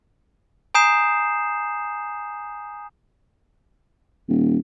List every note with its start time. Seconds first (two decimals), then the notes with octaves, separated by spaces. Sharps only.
0.75 G#5 A#5 D#6 G6 C7 E7
4.28 D#1